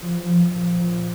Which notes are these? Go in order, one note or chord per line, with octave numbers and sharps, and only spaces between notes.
F3
F3
A#2
A#2